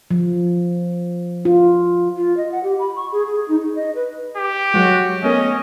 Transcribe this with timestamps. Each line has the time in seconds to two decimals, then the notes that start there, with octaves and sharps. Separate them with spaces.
0.11 F3
1.45 F4
2.16 F4
2.37 D#5
2.52 F#5
2.64 G4
2.79 B5
2.96 C#6
3.12 G#4
3.27 G#4
3.48 D#4
3.60 D#4
3.75 D#5
3.95 B4
4.37 G4
4.74 F#3 G#3 F#4
5.23 A3 B3 C#4 A#4 D#5